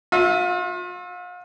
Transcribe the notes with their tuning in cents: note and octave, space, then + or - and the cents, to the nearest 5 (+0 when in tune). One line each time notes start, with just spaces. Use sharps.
F4 +40 E5 +0